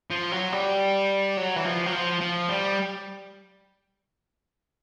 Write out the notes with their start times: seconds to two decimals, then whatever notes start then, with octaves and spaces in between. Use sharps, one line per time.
0.11 F3
0.32 F#3
0.52 G3
1.37 F#3
1.56 E3
1.65 F3
1.86 F#3
1.93 F3
2.21 F3
2.49 G3